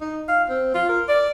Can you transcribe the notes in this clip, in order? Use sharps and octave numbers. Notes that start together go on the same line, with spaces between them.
D#4
F5
C4
F4
A#4
D5